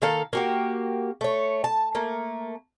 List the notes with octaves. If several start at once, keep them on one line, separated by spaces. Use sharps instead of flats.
D#3 A#3 A4 F5
A#3 F#4 G4
A3 C#5
A5
A3 A#3